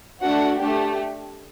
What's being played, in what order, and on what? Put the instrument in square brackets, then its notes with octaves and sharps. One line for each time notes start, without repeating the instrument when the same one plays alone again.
[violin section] A3 D4 F#4 F#5
A3 D4 G4